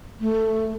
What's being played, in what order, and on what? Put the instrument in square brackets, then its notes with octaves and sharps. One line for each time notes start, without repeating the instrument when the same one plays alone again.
[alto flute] A3